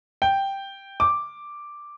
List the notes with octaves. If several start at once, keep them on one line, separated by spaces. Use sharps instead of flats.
G5
D6